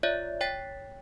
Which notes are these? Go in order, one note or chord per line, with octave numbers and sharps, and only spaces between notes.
F4 C#5 D5 E5
C#5 G5 A6 B6